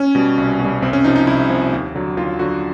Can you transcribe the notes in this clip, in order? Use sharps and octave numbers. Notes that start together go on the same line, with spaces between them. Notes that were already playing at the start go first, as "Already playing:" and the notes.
Already playing: C#4
B2 G3
C2
B2 G3
C2 C4
C#4
C3 F3 D#4
D#4
C2 E4
C3 F3
D#2
D3 F#3
D#2 F4
D3 F#3 F#4